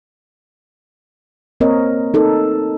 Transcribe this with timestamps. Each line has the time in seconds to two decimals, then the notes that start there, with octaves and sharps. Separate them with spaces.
1.61 A#3 C4 A#4 C#5 D#5
2.14 D#4 A4 A#4